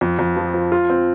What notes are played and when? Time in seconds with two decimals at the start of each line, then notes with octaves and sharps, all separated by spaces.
0.01 F2
0.19 F2
0.37 F3
0.54 F3
0.72 F4
0.90 C4